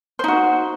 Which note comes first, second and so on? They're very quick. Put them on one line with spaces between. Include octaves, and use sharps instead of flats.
C5 D#4 F#4